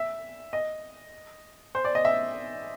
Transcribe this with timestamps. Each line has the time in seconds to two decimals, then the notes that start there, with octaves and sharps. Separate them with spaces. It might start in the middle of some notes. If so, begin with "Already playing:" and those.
Already playing: E5
0.53 D#5
1.75 C5
1.84 D5
1.95 D#5
2.05 E5